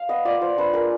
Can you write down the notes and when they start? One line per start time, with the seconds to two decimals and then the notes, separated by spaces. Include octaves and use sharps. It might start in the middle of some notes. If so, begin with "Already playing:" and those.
Already playing: F5
0.09 B3 D#5
0.25 F4 D5
0.41 F4 C5
0.58 D4 B4
0.74 G#3 A#4